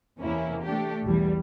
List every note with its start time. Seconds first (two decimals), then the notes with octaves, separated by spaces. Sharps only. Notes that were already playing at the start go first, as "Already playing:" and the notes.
0.20 E2 C3 A#3 C#4 E4
0.63 A3 D4 G4
1.05 B1 E2 E3 G3